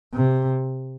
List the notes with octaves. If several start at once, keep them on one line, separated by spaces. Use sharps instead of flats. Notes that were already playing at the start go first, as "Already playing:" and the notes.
C3